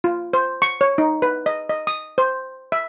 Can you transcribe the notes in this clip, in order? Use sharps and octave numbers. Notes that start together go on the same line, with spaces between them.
F4
C5
C#6
C#5
D#4
B4
D#5
D#5
D#6
C5
E5